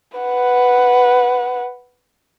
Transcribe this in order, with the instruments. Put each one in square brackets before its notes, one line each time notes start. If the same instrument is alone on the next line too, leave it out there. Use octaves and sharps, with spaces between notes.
[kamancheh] B4 F#5